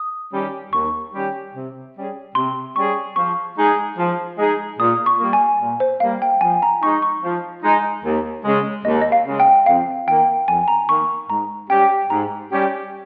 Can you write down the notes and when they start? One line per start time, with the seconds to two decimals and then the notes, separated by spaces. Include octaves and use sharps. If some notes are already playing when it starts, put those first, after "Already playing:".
Already playing: D#6
0.32 D#3 G3 C#4 G4
0.72 D#2 C#6
1.13 D#3 G3 C#4 G4
1.53 C3
1.95 G3 C#4 G#4
2.35 C3 C6
2.76 G3 C#4 G#4 C#6
3.16 F3 C#6
3.57 G#3 D#4 G#4
3.97 F3
4.38 G#3 D#4 G#4
4.79 A#2 D#6
5.06 C#6
5.20 G3 A#3
5.33 G#5
5.60 A#2
5.80 C5
6.00 G3 A#3 F5
6.22 G5
6.41 F3 G#5
6.62 A#5
6.82 G#3 D#4 C#6
7.02 C#6
7.23 F3
7.63 G#3 D#4
8.04 D#2
8.44 C#3 G#3
8.85 D#2 D#5
9.01 D#5
9.12 F5
9.25 C#3 G#3
9.40 G5
9.66 F2 F5
10.07 D#3 A#3 G5
10.48 F2 G#5
10.68 A#5
10.88 D#3 A#3 C#6
11.29 G#2 A#5
11.69 G3 C#4 G4 G5
12.10 G#2 A#5
12.51 G3 C#4 G4